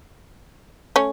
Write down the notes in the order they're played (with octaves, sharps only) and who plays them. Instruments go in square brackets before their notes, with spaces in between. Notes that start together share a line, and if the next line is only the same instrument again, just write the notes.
[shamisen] A3 C#4